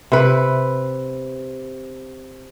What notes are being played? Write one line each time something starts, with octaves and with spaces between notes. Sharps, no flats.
C3 B4